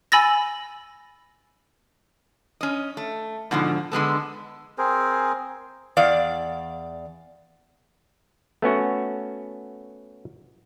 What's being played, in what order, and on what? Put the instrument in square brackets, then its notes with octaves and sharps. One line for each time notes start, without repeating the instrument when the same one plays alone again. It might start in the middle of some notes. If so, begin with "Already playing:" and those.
[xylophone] G#5 B5 E6 A6 A#6
[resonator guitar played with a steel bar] C#4 D#5
A3
G#2 B2 D3 F3
D3 G#3 B3 A4
[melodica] C4 G#4 A#4 C5
[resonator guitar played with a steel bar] E2 D5 F5
[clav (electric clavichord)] A3 B3 C#4 F#4